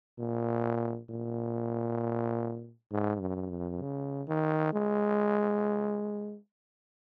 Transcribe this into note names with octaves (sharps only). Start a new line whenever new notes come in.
A#2
A#2
G#2
F#2
F2
C#3
D#3
G#3